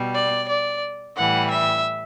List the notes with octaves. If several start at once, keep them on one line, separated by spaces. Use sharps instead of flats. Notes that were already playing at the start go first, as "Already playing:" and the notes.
Already playing: B2 G3
D5
D5
A2 E3 G3 F#5
E5